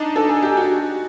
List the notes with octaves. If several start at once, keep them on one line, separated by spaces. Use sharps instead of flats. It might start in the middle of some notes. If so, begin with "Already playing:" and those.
Already playing: D4 D#4
A4
G#4
G4
F#4